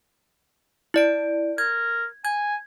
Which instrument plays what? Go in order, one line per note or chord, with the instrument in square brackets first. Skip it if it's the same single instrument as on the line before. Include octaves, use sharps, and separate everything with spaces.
[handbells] E4 D5 D7
[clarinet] A#4 [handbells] G#6
[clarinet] G#5 [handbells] G#6